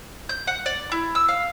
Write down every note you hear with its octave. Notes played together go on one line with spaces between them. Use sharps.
G6
F#5
D5
E4
E6
F5